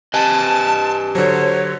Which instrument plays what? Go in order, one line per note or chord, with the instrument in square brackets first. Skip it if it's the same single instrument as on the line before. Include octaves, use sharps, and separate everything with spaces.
[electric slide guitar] G4 B4 D#5 [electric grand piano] G#5 [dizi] A5
[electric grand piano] D3 F#3 [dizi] C5 [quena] C#5